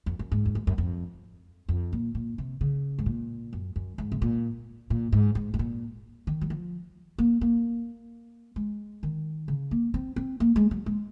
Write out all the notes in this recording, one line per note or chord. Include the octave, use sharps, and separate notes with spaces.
F2
F#2
G#2
F2
F#2
F#2
F2
F2
A#2
A#2
C3
C#3
G#2
A#2
F#2
F#2
G#2
C3
A#2
A#2
G#2
G#2
G#2
A#2
D#3
F#3
F3
A#3
A#3
G#3
D#3
C#3
A#3
C4
C4
A#3
G#3
F#3
G#3